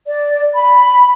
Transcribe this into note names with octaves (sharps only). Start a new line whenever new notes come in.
D5
B5